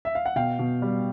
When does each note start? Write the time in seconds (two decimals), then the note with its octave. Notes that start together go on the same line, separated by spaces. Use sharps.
0.05 E5
0.15 F5
0.26 F#5
0.36 B2 F5 G5
0.59 B2
0.82 G3